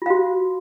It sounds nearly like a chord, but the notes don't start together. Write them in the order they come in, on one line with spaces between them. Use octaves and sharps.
F4 F5 F#4